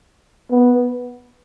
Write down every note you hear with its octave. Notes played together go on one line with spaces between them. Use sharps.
B3